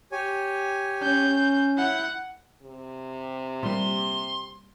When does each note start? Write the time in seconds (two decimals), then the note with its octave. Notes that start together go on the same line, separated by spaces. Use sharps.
0.12 G4 C#5 G#5
1.02 C#4 G6
1.77 E4 F#5 G6
2.62 C3
3.63 A#2 G3 C6